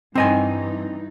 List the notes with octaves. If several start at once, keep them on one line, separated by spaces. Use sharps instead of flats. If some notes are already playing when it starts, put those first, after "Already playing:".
G2 E3 C4 D#4 D#5 G#5